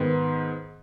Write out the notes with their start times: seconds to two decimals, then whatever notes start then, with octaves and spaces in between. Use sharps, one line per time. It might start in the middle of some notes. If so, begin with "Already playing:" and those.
Already playing: G#2 D#3 B3